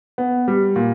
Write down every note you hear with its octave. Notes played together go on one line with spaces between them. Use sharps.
B3
G3
A#2